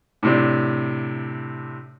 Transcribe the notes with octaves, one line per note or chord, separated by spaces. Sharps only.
A2 C3 D4